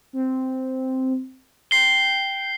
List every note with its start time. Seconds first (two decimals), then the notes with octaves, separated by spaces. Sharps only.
0.13 C4
1.71 G5 C7 G7